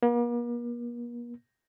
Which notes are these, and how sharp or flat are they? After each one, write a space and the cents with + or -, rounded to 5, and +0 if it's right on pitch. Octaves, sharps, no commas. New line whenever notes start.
A#3 +45